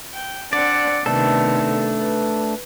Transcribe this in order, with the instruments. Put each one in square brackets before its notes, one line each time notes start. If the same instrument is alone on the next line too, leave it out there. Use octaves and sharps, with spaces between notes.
[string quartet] G5
[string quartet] C4 D4 F#5 [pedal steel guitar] D5
[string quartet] C3 D#3 B3 [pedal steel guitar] A3 D4 A4
[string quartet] B4